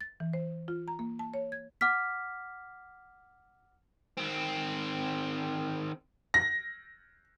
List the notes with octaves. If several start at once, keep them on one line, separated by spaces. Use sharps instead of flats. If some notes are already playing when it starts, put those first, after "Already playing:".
A6
E3
C5
F4
A#5
A#3
A5
C#5
G#6
F#5 D6 F6 B6
D#3 C4
A#6